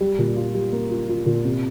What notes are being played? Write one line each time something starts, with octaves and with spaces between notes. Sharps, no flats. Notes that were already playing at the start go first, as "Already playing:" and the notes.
G3
A#2
F4
G3
A#3
F4
F4
A#2
C3